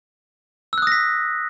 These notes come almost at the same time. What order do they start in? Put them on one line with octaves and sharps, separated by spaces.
E6 F#6 D#6 A#6 B6